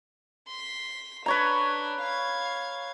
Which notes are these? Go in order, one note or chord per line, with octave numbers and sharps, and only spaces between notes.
C6 B6
D4 B4 C#5 A#5
F5 G#6